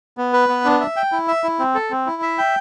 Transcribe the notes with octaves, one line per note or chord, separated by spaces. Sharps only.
B3
B4
B3
D4
E5
G5
E4
E5
E4
C4
A4
C4
E4
E5
G5